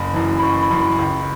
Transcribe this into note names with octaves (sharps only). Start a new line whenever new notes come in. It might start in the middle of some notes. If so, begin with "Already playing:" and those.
Already playing: F#1 B5
F#2 E3
B5
F#1 C#6
B5
F#2 E3
B5
C#2